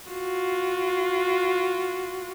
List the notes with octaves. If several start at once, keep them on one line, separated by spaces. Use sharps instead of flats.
F4 F#4